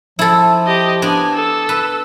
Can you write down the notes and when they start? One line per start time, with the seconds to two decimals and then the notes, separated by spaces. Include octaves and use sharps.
0.19 F3 E4 A4
0.66 G4 D#5
1.02 B3 D4 G#5
1.35 A4 E6
1.69 B4